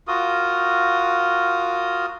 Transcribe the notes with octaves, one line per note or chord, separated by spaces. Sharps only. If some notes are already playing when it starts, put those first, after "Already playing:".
F4 F#4 A#4 D#6